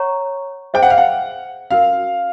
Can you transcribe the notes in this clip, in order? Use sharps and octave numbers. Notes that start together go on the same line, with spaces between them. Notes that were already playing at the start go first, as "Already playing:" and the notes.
Already playing: C#5 F#5 A#5 C#6
G#4 C5 E5 G5
F#5
F5
F#5
C#4 F#4 A#4 F5